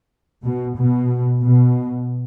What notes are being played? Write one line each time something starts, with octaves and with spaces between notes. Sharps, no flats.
B2
B2
B2